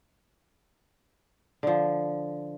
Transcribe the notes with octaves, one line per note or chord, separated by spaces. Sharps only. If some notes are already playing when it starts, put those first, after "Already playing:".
D3 F3